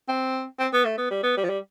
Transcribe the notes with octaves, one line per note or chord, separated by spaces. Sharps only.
C4
C4
B3
A3
B3
G3
B3
G3
F3
G3